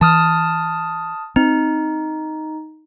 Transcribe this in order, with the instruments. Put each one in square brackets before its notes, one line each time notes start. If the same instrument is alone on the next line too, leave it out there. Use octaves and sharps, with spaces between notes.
[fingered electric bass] E3 [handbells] A5 D#6 F6
[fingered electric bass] C4 [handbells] D#4